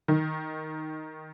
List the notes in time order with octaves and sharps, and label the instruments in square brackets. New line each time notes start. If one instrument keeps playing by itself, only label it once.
[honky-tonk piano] D#3